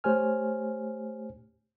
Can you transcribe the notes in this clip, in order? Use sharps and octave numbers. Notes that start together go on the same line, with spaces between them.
A3 G4 C5 C#5 G#5 F6